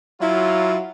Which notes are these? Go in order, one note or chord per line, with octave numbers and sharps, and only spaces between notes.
F#3 E4 F4